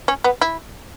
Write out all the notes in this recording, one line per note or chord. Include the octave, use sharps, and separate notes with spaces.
C#4
B3
E4